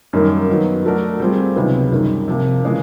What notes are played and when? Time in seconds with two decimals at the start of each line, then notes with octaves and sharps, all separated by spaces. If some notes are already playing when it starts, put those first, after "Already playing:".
0.13 F#2 D#3 G3 A#3
0.48 D#3 F#3 B3
0.85 F#3 A3 D4 F#4 A#4
1.20 G3 C4 F4 G#4
1.56 C#2 C3 D#3 F#3 B3
1.92 F#2 D#3 G3
2.28 C3 F3 A#3
2.63 C#3 E3 G#3